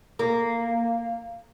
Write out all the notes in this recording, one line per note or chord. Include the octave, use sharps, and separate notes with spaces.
A#3